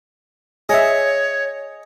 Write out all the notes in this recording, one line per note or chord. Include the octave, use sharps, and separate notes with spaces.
G#4 C#5 D#5 E5 G#5